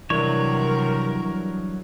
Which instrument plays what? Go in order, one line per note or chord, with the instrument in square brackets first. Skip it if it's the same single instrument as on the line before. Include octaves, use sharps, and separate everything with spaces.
[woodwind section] C3 D#3 [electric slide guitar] E3 G3 D4 [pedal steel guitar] F#3 C#5 [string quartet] A#4